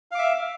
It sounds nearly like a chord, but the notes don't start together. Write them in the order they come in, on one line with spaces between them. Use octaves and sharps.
F5 D6 E5